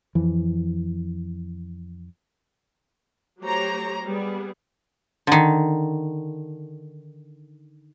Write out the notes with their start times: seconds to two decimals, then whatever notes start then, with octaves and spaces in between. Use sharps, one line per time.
0.15 F2 E3
3.41 F#3 A3 G4 C5 C#5 A#5
4.05 G3 B3 G#4
5.27 D3 D#3